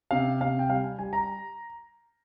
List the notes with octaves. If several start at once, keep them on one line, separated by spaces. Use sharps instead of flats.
C3 F5
C3 F5
G5
G3 F5
G#5
G3 G#5
A#5